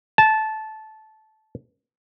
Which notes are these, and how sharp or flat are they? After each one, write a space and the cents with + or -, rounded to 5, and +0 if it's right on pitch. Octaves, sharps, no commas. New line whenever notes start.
A5 -15